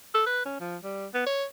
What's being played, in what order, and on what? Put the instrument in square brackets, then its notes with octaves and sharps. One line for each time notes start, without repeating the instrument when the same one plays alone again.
[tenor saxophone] A4
B4
C#4
F3
G3
B3
C#5